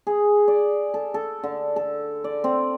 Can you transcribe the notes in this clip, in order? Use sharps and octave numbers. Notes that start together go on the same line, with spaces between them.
G#4
D5
A4
A4
D3
A4
D5
C4